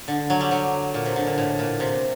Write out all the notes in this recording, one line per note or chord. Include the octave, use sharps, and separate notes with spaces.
D3
F#3
G3
F#3
A#2
C3
D3
A#2
A2
A#2
C3